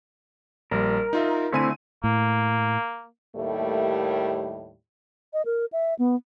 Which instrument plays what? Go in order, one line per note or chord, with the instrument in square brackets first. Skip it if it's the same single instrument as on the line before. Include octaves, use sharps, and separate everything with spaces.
[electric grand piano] A#1 G3 [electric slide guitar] A#4
[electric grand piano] D#4 F4 E5
[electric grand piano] D3 G#5 D#7 [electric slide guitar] A3 C4 E4
[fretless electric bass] A2 [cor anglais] A#3
[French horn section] D#2 A2 G3 A3 A#3 G4
[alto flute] D#5
A#4
E5
B3